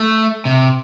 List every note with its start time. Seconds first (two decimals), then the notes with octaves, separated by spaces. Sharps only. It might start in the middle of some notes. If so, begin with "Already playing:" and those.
Already playing: A3
0.45 C3